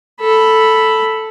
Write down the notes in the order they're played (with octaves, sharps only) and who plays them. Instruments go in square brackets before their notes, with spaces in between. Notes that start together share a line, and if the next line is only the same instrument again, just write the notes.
[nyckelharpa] A4 B5